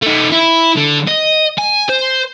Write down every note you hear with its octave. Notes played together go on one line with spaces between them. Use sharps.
A3 D#4
E4
D3
D#5
G#5
C5